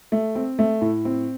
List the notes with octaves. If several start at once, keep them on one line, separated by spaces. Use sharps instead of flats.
A3
C4
A3
A2
C4